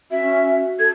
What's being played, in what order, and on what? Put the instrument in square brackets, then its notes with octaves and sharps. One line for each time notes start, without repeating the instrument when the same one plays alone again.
[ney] C#4 [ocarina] F#4 [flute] E5
[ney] A4 [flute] G#6